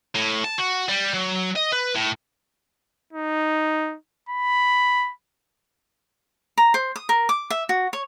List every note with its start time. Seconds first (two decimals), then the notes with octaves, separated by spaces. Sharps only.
0.15 A2
0.44 A5
0.58 F#4
0.89 G3
1.14 F#3
1.56 D#5
1.73 B4
1.95 A2
3.13 D#4
4.29 B5
6.58 A#5
6.74 C5
6.96 D#6
7.09 A#4
7.29 D6
7.50 E5
7.69 F#4
7.93 C#5